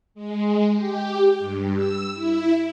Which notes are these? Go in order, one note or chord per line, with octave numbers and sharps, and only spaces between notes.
G#3
G4
G2
E6
E4